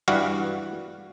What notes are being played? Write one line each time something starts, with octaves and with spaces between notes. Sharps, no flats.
G2 E3 G3 F#4 F5 F#5